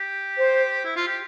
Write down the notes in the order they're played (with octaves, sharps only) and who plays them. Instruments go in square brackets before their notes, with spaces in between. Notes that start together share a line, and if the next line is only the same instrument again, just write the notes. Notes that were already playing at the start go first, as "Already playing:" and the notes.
Already playing: [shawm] G4
[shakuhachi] C5
[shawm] E4
F4
G4